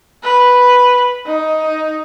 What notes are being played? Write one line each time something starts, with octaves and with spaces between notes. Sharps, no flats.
B4
D#4